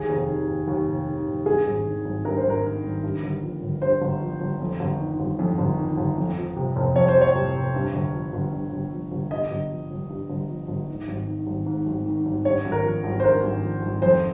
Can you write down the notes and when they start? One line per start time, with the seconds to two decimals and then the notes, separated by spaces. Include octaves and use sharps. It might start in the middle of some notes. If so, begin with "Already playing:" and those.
Already playing: D#2 G#4
0.09 F1
0.28 D#3
0.48 F1
0.68 D#2
0.87 F1
1.07 D#3
1.27 F1
1.46 G2 G#4
1.66 G#1
1.86 D#3
2.05 G#1
2.25 G2 A#4
2.37 C5
2.44 G#1
2.50 A#4
2.64 D#3
2.83 G#1
3.03 G2
3.23 G1
3.43 F3
3.62 G1
3.81 G2 C5
4.02 G1
4.21 F3
4.41 G1
4.60 F2
4.80 G1
5.00 D#3
5.20 G1
5.39 F2
5.58 G1
5.78 D#3
5.98 G1
6.18 F2
6.37 F3
6.56 C3
6.76 F1
6.95 F2 C#5
7.08 C5
7.15 F3
7.21 C#5
7.35 C3
7.55 F1
7.75 G2
7.94 G1
8.14 F3
8.33 G1
8.52 G2
8.72 G1
8.92 F3
9.12 G1
9.31 G2 D#5
9.51 G1
9.71 F3
9.91 G1
10.09 G2
10.30 G1
10.49 F3
10.68 G1
10.88 G#2
11.08 G#1
11.27 D#3
11.47 G#1
11.66 G#2
11.86 G#1
12.06 D#3
12.26 G#1
12.45 G2 C#5
12.65 G#1
12.72 A#4
12.84 F3
13.04 G#1
13.20 C5
13.24 G2 A#4
13.44 G#1
13.63 F3
13.82 G#1
14.02 F2 C5